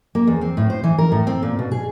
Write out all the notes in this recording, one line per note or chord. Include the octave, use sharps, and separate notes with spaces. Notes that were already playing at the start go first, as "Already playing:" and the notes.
A#3
E2
C4
A2
C5
E3
A#4
A2
C4
A#2
B2
G#4